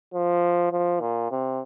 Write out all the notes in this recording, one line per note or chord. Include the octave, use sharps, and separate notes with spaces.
F3
F3
A#2
C3